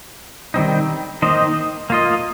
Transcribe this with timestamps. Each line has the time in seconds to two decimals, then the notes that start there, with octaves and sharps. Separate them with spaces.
0.54 D#3 G3 C4 D#4
1.22 D#3 A#3 D#4 C5 D#5
1.90 A#3 F4 D#5